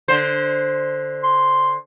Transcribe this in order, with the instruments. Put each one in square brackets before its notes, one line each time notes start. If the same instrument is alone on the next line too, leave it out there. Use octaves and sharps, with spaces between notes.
[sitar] D3 C5
[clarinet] C6